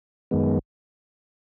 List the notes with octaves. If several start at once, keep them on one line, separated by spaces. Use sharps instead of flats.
F#2 D#3 G#3 B3